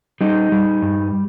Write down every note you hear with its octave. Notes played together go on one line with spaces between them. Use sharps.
G3 D#4
G3
G2